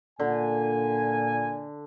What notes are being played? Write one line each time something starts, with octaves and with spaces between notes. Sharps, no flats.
A#2 D3 G#5